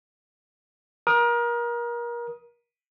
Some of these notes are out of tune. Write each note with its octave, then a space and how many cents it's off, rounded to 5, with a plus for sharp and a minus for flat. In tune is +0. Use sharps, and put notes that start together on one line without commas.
A#4 +30 D#6 +5